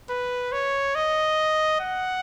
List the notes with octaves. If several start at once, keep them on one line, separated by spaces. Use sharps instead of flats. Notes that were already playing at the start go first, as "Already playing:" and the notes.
B4
C#5
D#5
F#5